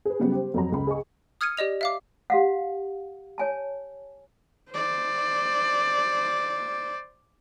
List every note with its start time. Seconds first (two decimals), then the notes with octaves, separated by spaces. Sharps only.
0.05 G#4 B4
0.20 C#3 F#3 G3 B3
0.32 G4 C5
0.54 F2 F#3 A#5
0.72 C#2 B5
0.87 G#4 D#5 G#5 C#6
1.41 D#6 F6 G#6 C#7 D#7
1.57 G4 D5 D#5 F7
1.81 E5 F5 D6
2.30 G4 F5 F#5
3.38 C#5 G#5 A5
4.70 C5 D5